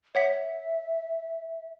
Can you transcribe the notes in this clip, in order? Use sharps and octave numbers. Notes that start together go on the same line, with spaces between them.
C#5 E5 F#5 B6